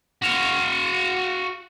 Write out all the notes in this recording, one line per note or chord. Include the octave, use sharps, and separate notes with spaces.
F#4 F5